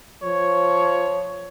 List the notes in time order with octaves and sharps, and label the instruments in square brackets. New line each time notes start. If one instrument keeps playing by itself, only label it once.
[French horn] F3 [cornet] C#5